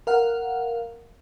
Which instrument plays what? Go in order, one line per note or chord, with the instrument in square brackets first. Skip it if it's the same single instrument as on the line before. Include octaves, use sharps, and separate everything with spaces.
[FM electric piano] A#4 F5 F#5